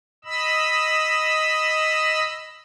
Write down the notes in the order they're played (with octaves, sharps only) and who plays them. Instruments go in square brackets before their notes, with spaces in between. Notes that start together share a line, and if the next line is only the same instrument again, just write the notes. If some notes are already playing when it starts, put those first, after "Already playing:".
[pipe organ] D#5 B5 E6